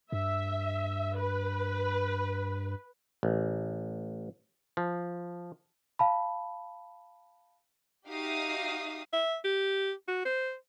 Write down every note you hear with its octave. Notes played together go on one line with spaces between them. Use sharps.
G2 E5
B4
A1
F3
F5 A5 B5
D#4 F#4 G4 E5 F5 D#6
E5
G4
F#4
C5